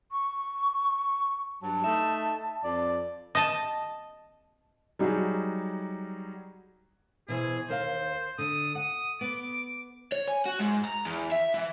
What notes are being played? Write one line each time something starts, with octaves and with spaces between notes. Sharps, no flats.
C#6
G2 F#3 A5
A3 D#4 E5
F2 D5
D#5 A5
F#3 G3 D#4 F#4 G#4
B2 E3 G#4 C5
D#2 A#4 C5 F5
D3 D#6
F#5 D#6
B3 D6
C#5
G#5
F#4
G#2
A#5
E2
E5
E3